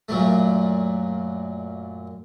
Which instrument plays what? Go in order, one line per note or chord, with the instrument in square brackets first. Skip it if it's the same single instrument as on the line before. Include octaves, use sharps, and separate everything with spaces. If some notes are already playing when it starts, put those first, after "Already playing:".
[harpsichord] F#2 A#2 F#3 A3